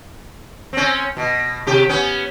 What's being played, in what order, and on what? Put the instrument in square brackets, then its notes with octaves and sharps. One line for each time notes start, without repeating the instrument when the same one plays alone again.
[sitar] C4 C#4
B2
C3 G4
B3 C#4